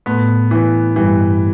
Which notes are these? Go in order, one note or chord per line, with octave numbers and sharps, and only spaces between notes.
A2 A3 B3
E3
G2 E3 G3